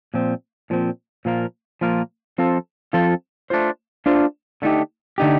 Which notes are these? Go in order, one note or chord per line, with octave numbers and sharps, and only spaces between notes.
A#2 F3 C4
A#2 F3 C4
A#2 F3 A#3 F4 A#4
A#2 F3 A#3 F4 A#4
F3 C4 F4 A4 C5
F3 C4 F4 A4 C5
A3 D4 F4 C5
A3 D4 F4 C5
D3 A3 D#4 G4
D3 A3 D#4 G4